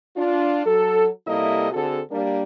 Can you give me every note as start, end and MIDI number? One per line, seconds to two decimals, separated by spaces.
0.16 0.65 62
0.16 0.65 65
0.65 1.07 54
0.65 1.07 69
1.26 1.70 48
1.26 1.70 55
1.26 1.70 58
1.26 1.70 64
1.26 1.70 69
1.26 1.70 75
1.72 2.00 50
1.72 2.00 60
1.72 2.00 66
1.72 2.00 68
1.72 2.00 69
2.11 2.42 55
2.11 2.42 58
2.11 2.42 62